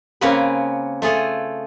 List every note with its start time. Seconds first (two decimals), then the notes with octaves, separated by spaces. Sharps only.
0.21 C#3 A#3 C4 C#4 A#4 B4
1.02 A3 F4 G#4 A4